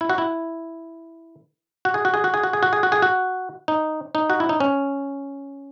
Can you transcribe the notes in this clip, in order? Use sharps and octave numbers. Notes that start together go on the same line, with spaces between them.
E4
F#4
E4
F#4
G#4
F#4
G#4
F#4
G#4
F#4
G#4
F#4
G#4
F#4
G#4
F#4
D#4
D#4
F#4
E4
D#4
C#4